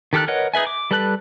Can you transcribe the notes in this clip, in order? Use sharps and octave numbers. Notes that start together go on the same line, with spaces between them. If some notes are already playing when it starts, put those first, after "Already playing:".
D#3 G4 A4 F6 F#6
A#4 B4 C#5 D#5 F#5
D#4 G#4 B4 E5 G#5
D6
G3 A4 B4 A5 F#6